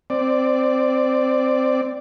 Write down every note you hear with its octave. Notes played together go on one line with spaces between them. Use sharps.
C4 D5